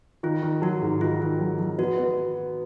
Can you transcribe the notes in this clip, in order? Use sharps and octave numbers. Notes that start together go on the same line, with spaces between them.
D#3 F4
D#3
F#3 F#4
G#2
D#3 F4
D#3
F#3
F#3
B3 F#4
B3